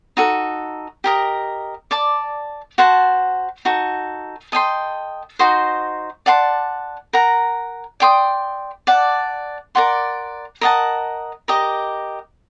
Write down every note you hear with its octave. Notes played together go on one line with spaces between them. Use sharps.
D#4 F#4 A4
G4 A#4 D#5
D5 A5 D6
F#4 C5 F#5 A5
D#4 F#4 A4
A4 D#5 G5 C6
D#4 F#4 C5 D#5
D5 F#5 A5 C6
A#4 F#5 A#5
D5 G5 C6 D#6
D5 F#5 A5
A#4 D5 F#5 C6
A#4 D#5 F#5 A5
G4 A#4 D#5